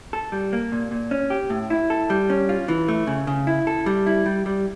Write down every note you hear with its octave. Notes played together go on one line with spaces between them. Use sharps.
A4
G3
A#3
A#2
A#2
C#4
G4
A2
E4
A4
G3
C#4
F4
E3
A3
C#3
C#3
E4
A4
G3
E4
G3
G3